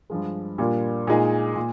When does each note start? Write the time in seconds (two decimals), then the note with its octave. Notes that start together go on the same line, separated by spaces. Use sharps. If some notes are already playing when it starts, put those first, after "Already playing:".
0.10 G2 F3 G#3
0.58 A#2 G3 A#3 D4 F4
1.07 A#2 G#3 D#4 G#4
1.56 A#2